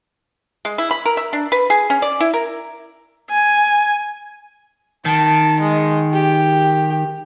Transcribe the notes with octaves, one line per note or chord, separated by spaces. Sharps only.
G#3
E4
B5
A#4
E5
D4
B4
G#4
C#4
D5
E4
A#4
G#5
D#3 A5
G#3
G4